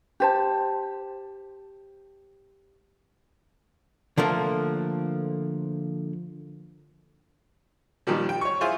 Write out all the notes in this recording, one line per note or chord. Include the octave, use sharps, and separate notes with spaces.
G4 C5 A5
D3 F3 A3 A#3
A#2 D#3 F3 G3
G5
C#5 C#6
E4 F4 G#4 C5